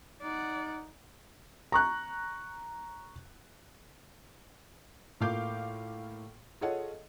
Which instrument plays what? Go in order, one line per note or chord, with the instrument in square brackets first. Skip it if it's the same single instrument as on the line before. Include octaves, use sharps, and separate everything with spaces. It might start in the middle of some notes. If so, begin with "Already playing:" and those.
[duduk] D#4 [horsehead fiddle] D5 F#5
[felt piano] A#5 C#6 F#6
A2 A#3 F4 F5 D6 G6
F4 G#4 A4 C#5 D#5 F#5